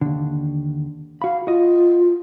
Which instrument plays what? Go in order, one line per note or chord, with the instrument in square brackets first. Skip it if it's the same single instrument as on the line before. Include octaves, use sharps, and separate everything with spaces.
[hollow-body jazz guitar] D#2 D3
[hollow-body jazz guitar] F#4 B5 [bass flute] F5
[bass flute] F4 [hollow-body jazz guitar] F#4 D#5